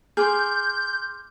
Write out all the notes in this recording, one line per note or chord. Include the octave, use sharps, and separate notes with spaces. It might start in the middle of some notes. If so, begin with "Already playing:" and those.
G#4 C6 D6 F6 G6